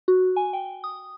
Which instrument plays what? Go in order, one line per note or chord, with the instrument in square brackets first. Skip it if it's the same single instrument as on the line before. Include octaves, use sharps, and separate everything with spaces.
[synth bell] F#4
G#5
G5
D#6